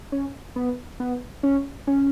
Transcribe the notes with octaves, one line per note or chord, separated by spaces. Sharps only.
C#4
B3
B3
C#4
C#4